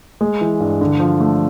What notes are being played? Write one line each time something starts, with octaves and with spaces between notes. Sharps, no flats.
G#3
E3
G2
D3
F3
A3